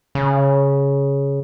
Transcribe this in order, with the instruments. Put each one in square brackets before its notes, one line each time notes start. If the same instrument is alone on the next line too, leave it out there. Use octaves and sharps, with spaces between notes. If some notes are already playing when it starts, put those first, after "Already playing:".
[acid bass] C#3